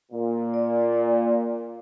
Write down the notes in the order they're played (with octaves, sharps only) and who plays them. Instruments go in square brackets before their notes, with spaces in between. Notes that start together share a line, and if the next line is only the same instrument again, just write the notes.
[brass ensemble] A#2
[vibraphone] D5